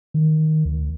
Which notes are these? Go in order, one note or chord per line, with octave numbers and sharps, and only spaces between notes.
D#3
D2